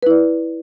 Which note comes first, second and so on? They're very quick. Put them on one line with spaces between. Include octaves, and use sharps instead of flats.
B4 E4 D5